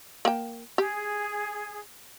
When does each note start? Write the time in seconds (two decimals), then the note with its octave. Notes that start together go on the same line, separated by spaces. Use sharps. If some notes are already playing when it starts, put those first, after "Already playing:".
0.25 A#3 G5
0.78 G4 G#4